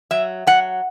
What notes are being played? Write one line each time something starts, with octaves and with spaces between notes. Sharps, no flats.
F#3 E5
F#3 F#5